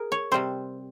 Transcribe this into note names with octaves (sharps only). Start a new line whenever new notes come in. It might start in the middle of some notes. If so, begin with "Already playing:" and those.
Already playing: G#4 A#4
C#5
C3 G3 C4 C5